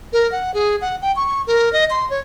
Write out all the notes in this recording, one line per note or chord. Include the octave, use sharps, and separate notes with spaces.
A#4
F#5
G#4
F#5
G5
C#6
A#4
D#5
C6
C#5